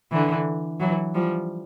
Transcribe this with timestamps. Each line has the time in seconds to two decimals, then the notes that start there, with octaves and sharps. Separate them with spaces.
0.12 D3 E3
0.80 E3 F#3
1.15 F3 G3